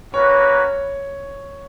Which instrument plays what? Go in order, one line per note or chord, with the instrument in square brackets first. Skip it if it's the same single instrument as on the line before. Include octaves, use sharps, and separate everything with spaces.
[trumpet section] A#3 C#4 F#4 B4 [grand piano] C#5